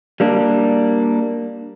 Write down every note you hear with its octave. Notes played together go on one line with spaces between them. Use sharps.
G3 A#3 D4